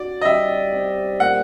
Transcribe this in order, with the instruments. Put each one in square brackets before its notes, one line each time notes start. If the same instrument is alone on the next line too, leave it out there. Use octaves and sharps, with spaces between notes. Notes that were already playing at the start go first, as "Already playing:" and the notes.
Already playing: [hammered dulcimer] F#4 [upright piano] D5
[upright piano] D#5
[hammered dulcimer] G3 [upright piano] E5
[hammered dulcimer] C3
[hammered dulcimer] A#2 [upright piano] F#5